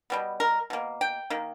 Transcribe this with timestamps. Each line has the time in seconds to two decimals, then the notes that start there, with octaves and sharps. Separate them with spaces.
0.10 B2 G3 B3
0.40 A#4
0.70 B2 A#3
1.01 G5
1.30 D#3 A#3